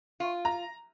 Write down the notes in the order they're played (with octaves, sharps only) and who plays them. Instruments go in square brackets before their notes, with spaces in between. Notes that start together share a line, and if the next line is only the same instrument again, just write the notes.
[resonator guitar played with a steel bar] F4
[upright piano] A#5